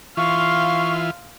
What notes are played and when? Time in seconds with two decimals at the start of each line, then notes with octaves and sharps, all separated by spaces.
0.17 E3 F4 F5 C6 C#6